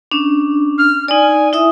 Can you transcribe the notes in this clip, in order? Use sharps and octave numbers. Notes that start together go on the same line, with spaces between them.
C#4 D4
F6
D#4 D5 G#5
E4 E5 D#6